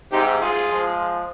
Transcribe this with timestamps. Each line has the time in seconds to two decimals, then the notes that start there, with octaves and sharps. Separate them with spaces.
0.13 G#2 C3 D#4 G4
0.41 F4 G#4
0.69 F3 G#3